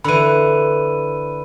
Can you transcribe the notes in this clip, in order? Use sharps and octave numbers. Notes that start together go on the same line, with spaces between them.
D3 E3 B5 D#7